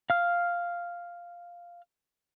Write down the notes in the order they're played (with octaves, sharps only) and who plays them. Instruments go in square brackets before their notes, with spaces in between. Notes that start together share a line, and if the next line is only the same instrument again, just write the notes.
[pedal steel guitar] F5 F6